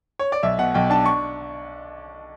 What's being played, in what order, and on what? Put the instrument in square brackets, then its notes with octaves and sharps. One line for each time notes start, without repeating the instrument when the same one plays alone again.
[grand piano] C#5
D5
B1 E5
B2 F#5
B1 G5
D4 A5
C#6